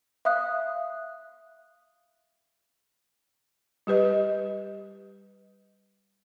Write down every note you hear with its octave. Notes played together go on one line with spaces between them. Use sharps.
E5 F5 D#6 F#6
G3 G4 B4 D#5